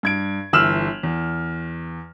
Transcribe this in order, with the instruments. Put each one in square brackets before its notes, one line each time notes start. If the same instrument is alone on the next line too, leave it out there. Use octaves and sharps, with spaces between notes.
[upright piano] G2 G#6 D7
G1 E3 E6 F6 E7 F#7
E2